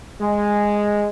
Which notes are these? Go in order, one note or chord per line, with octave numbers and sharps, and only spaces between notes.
G#3